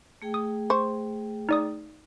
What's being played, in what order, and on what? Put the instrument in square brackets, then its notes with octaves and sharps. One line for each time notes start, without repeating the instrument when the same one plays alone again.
[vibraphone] A3 G#4 G5
[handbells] D#6
[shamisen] C5 [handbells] C#6
[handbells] D#4 D5 D#6